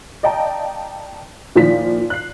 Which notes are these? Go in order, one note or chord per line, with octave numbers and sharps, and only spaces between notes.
D5 D#5 F5 G5 A5 A#5
A#2 D#3 F3 E4 B6
F#6 C7